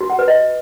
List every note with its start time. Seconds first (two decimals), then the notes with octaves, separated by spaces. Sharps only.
0.01 F#4
0.10 F#5
0.19 B4
0.28 D#5